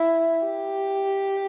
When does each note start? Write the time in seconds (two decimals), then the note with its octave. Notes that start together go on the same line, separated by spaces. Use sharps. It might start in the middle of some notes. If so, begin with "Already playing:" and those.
Already playing: E4
0.45 G4